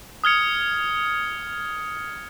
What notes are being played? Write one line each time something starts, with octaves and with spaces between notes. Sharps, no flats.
D#6 F6 G#6 C#7